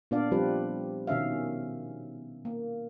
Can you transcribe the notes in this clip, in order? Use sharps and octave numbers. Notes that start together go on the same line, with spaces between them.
A#2 B3 D4 D5 F5
F3 G3 C4 F4 G4 B4
B2 D#3 C#4 E5 F5
A#3